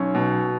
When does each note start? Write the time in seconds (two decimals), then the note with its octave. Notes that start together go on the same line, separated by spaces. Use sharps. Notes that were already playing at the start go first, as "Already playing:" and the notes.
Already playing: B1 C#4
0.15 B2